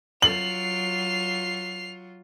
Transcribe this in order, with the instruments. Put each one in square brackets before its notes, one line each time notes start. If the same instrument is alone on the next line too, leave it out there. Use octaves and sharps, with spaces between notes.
[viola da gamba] F#3 F4 [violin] C7 F7 [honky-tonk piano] F#7